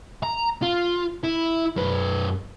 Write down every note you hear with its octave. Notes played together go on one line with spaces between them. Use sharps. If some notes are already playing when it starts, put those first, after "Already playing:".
A#5
F4
E4
F#2 B4